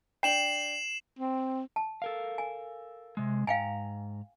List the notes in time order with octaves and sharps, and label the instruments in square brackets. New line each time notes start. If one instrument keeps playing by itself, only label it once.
[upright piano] D4 G5 [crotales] C7 E7 F#7
[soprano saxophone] C4
[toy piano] A5
[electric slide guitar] A4 A#4 F5
[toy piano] G#5
[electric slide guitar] C3 G#3
[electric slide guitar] G#2 A#5 [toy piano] F5 G5 G#5